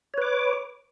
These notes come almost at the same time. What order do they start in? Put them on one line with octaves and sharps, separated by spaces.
C#5 B4 D6